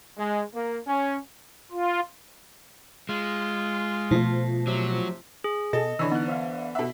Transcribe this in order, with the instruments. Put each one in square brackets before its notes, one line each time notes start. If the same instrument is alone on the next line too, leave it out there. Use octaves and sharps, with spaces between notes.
[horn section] G#3
A#3
C#4
[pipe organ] F4
[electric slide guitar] G#3 [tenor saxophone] F4
[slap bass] B2 [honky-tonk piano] F3 A3
[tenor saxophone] C3 [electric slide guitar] F#3
[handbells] G#4
[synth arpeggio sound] B2 G#4 [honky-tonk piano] A4 [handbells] D#5
[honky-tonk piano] D3 E3 [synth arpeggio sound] C#5 B5 E6
[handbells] B3 [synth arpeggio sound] D#4 F#6
[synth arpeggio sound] C5 E5 F5
[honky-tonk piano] B2 E5 [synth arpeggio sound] A4 F#5